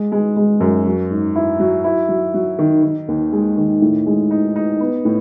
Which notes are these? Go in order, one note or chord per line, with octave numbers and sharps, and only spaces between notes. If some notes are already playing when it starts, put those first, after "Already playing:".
Already playing: G#3
G#3
G#3
F#2
F#3
G#2
E4
F#3
E4
F#3
F#3
D#3
D#3
D#2
G#3
D#3
A2
G#3
D#4
D#4
B3
A2